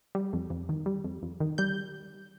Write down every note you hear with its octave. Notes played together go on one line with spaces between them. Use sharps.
G3
F2
F2
D#3
G3
F2
F2
D#3
G3 G6